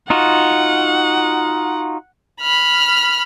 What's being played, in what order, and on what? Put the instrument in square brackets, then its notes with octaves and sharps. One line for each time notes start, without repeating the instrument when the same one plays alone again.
[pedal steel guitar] D#4 F4 F#4 [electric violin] F#5
[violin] B5 F6